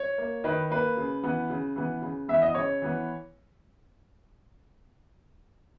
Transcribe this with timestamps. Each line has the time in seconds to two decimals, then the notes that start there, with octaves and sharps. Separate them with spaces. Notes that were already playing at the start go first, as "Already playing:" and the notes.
Already playing: C#5
0.18 A#3
0.44 D#3 B4
0.70 A#3 B4
0.97 C#3
1.24 E3 B3
1.50 C#3
1.76 E3 B3
2.02 C#3
2.28 E3 B3 E5
2.42 D#5
2.55 C#3 C#5
2.82 E3 B3